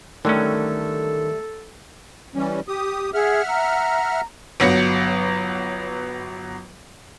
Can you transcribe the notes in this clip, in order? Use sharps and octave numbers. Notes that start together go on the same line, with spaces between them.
D3 D#3 F#3 G3 A3 C#4 A4
E3 G3 C#4
G4 D#6
G#4 E5 F#5 F6
A#5
G1 F#3 B3 A#6 C#7